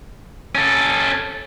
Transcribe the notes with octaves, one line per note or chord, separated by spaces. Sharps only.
C#4 A4